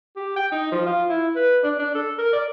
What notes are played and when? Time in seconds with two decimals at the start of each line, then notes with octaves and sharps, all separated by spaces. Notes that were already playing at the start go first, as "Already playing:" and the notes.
0.17 G4
0.37 G5
0.52 D#4
0.72 F3
0.86 F4
1.10 E4
1.36 B4
1.64 D4
1.79 D4
1.95 A4
2.19 A#4
2.33 D5